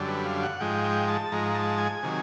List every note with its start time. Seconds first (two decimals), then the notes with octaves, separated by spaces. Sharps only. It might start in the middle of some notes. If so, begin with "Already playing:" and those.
Already playing: F#2 D3 G3
0.08 B4
0.25 F5
0.43 F#5
0.60 G#2 F3 G#3 G5
0.84 G5
1.08 A5
1.32 G#2 F3 G#3 A#5
1.55 A5
1.78 G#5
2.03 C3 D#3 F#3